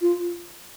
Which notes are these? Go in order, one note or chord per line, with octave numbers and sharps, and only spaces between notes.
F4